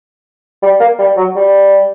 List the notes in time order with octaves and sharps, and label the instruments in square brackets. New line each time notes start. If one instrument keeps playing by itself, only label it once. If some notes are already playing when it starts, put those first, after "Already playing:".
[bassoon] G3
A#3
G3
F#3
G3